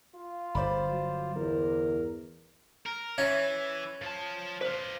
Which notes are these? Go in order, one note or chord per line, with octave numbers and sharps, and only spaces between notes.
F4
G1 C5 D5 B5
F#3
E2 A#4
A#4
E3 C#4 E5
F3 A5
F4 B4 C5